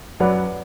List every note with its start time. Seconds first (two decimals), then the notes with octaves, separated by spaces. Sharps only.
0.20 F#2 F#3 B4 D5 F#5